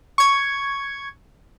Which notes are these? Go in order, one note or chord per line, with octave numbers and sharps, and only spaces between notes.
C#6 G#6